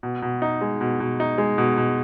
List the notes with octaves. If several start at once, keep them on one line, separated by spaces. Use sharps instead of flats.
B2
B2
D#4
G#3
B2
B2
D#4
G#3
B2
B2